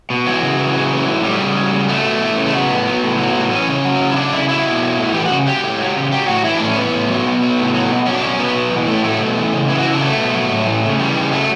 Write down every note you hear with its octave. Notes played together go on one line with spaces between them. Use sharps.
B2
E3 F#3
C#3
E3
C#3
E3
A2
F#3 G3
C#3
F#3
C#3
F#3 A3
B2
E3
C#3
A3
F#3 B3
A2
F#3
A2
F#3
A2
E3 C#4
C#3
F#3
C#3
E4
F#3 D4
C#3 E4
F#3 E4
B2
F#3
A2
E3 G4
F#4
C#3
F#3 G4
A2
F#3
C#3
F#3 G4
A2 F#4
E3 E4
D4
A2
C#4
E3 B3
A2
F#3
B2
F#3
A2
F#3
B2
F#3 C#4
D4
B2 C#4
F#3 B3
B2
E3
A2 A3
F#3 A3
B2
E3
C#3
E3 E4
F#4
C#3 E4
D4
F#3 A3
B2
F#3
A2
E3
C#3
E3 G3
C#3
F#3 A3